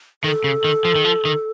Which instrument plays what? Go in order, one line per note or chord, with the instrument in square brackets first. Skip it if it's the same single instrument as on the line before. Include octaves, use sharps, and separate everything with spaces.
[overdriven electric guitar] D#3 [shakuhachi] A4
[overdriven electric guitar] C#3
D#3
F3
D#3
F3
D#3